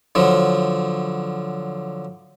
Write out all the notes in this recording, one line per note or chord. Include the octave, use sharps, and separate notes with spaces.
D3 F3 F#3